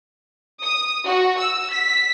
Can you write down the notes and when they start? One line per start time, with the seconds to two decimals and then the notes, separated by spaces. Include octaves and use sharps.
0.63 D#6
1.05 F#4
1.38 E6
1.73 B6